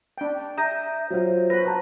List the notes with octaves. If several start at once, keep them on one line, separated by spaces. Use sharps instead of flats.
D4 G5
E5 A#5 D#6 G6 A#6
F#3 F4 C5
F#4 B4 A#6
A5 A#5